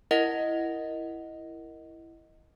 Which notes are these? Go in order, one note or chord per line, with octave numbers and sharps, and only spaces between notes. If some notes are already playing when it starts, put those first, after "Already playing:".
E4 A#4 D#5 F#5 A#6